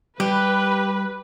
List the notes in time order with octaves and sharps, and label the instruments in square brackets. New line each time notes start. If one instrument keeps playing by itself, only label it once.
[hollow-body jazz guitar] G3 [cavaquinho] G4 [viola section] B4